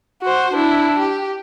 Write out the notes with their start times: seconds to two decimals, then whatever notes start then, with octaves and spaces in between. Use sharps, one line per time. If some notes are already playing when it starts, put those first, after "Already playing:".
0.22 F#4 C5
0.53 D4 E4
0.99 G4